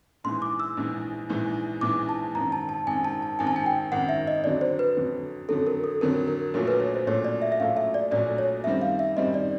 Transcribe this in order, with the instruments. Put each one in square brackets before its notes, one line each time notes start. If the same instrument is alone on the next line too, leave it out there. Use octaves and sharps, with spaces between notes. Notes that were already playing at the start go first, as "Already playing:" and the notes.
[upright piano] A#1 G#2 E3 [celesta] C6
[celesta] D6
E6
[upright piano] A#1 G#2 E3
A#1 G#2 E3
[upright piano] A#1 G#2 E3 [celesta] D6
[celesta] A5
[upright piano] G#1 F#2 D#3 [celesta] A#5
[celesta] A5
A5
[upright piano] G#1 F#2 D#3 [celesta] G#5
[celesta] A5
A5
[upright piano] G#1 F#2 D#3 [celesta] G#5
[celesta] A5
G#5
G5
[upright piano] G#1 F#2 D#3 [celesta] F#5
[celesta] E5
D#5
[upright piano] F2 D3 F#3 [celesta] D5
[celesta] C5
B4
[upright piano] F2 D3 F#3
[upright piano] F2 D3 F#3 [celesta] A4
[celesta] A#4
A4
[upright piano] F2 D3 F#3 [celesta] A#4
[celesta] A#4
[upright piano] A#1 A#2 F#3 A3 [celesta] A#4
[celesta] B4
C#5
C5
[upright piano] A#1 A#2 F#3 A3 [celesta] C#5
[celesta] D5
E5
E5
[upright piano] A#1 A#2 F#3 A3 [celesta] F5
[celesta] E5
D5
[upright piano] A#1 A#2 F#3 A3 [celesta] D5
[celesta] C#5
[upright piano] F#2 D#3 G3 C4 [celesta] E5
[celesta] F5
E5
[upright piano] F#2 D#3 G3 C4 [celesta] D#5
[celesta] D5